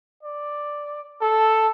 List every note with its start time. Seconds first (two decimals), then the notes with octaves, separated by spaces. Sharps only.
0.23 D5
1.21 A4